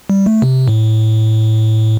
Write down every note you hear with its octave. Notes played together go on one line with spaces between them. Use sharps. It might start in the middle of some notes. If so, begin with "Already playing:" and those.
G3
A3
C3
A2